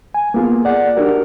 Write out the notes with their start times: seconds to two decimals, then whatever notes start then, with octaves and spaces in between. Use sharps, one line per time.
0.14 G#5
0.34 A#3 B3 F4 G#4
0.65 D5 F#5
0.97 D4 D#4 F#4 G4 A#4